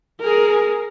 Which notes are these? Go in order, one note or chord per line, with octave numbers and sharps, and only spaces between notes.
G#4 A#4